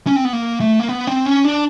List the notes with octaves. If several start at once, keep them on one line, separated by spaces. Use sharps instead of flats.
C#4
C4
B3
A#3
A3
A#3
B3
C4
C#4
D4